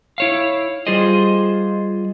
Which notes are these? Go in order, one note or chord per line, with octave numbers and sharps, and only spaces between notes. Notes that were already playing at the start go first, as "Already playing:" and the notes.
E4 C#5 F5
G3 F4 G#4 C5 D#5